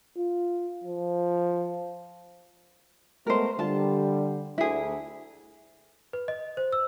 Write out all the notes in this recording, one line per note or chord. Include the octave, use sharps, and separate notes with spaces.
F4
F3
G#3 A3 B3 A#4 C5
D3 G3 F4 A5
D2 E4 G#4
B4
D#5
C5
E6